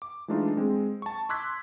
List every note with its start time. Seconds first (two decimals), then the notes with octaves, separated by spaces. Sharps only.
0.02 D6
0.28 E3 G#3 A3 D4 D#4 F4
0.57 G#3 C4
1.02 A5 C#6
1.29 C6 D6 E6 F#6 G#6 B6